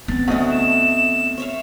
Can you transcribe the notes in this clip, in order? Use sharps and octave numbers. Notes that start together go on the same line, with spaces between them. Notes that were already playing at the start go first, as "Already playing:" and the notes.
B3 C4 A6
D2 A3 D#5 F#5 B5
E7
C#5 E5 F5